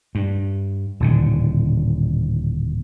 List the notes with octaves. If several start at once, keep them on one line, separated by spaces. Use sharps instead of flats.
G2
D#1 A2 D3